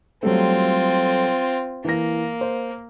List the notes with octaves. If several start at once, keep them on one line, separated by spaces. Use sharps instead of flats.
F#3 G3 A3 C4 F4
E3 A#3 A#6
C5